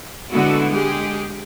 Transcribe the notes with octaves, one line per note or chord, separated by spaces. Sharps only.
D3 G#3 B3 E4 F#4 A4
G#3 G4 G#4